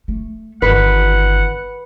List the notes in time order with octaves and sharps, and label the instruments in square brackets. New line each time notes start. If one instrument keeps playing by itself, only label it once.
[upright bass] A3
[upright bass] G1 D#3 [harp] B4 [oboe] F#5